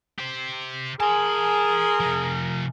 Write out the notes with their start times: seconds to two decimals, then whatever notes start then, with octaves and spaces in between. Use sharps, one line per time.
0.19 G4 C5
1.00 G#4 A#4 G#5 A5 C6
2.00 C3 F3